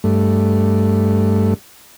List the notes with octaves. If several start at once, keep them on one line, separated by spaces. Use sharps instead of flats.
G2 A3